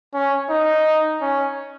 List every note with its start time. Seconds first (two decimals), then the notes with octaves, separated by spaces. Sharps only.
0.14 C#4
0.49 D#4
1.21 C#4